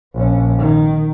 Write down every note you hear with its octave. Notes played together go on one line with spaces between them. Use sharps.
A#1 C#4
D#3